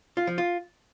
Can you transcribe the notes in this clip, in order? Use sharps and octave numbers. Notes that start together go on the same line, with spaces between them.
F4
F3
F4